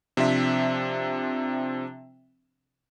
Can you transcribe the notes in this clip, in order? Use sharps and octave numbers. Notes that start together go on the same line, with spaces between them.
C3 F3 C4 D4 E5 B6